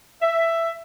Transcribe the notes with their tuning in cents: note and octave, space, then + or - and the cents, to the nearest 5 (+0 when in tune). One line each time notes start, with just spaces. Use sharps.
E5 +10